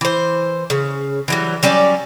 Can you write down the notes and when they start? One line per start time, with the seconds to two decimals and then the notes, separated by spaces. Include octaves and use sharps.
0.01 E3 C5
0.70 C#3
1.28 E3 F#3 G3
1.63 F#3 G3 C#4 D5